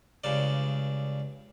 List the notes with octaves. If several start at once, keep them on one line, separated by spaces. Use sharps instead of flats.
C#2 G2 C#3 D5